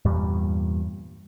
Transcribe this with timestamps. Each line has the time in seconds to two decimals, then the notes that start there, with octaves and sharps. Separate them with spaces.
0.05 E2 G2 A#2 G3